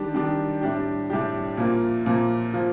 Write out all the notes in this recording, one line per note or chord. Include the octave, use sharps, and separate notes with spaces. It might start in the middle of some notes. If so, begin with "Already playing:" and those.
Already playing: D#3 G3 D4 G4
D#3 G3 D4 G4
A2 G3 D4 G4
A2 G3 D4 G4
A#2 F3 A#3 F4
A#2 F3 A#3 F4
F3 A#3 F4